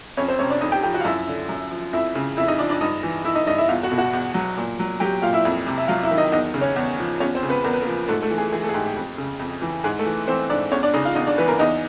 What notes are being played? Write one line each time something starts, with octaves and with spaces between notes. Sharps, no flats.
F2 C#4 C#5
C4 C5
C3 C#4 C#5
D4 D5
F2 D#4 D#5
G4 G5
F3 G4 G5
F#4 F#5
F5
F#2 E4 E5
D3
F#2
F3
F2 E4 E5
C#3
F2 E4 E5
D#4 D#5
F3 D4 D5
D4 D5
G2 D#4 D#5
E3
E3 E4 E5
D#4 D#5
G2 D#4 D#5
E4 E5
E2 F4 F5
F#4 F#5
B2
F#4 F#5
E2
F#3
A#2
F#3
F#3 G4 G5
A#2 F4 F5
E4 E5
F2
C3
E5
F#3 F4 F5
E4 E5
D#3
D#4 D#5
E2 D#4 D#5
C#3
C#4 C#5
E2
F3
E2 C#4 C#5
C4 C5
C#3
B3 B4
E2 A#4
B4
A#3 A#4
F3
G#2 A3 A4
A3 A4
E3
G#4
E3 G#4
A3 A4
G#4
G#2 G4
G4
F2
C#3
F2
E3
G#2 G#4
A3 A4
E3
E3 C4 C5
G#2 D4 D5
E2 C#4 C#5
D4 D5
C#3 D#4 D#5
F4 F5
E2 D#4 D#5
D4 D5
E3 B3 B4
A#3 A#4
E2 D#4 D#5